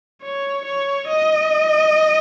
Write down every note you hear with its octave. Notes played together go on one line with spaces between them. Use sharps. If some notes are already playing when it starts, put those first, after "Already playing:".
C#5
C#5
D#5